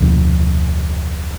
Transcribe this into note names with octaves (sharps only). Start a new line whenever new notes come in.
F1 D2 B2 F3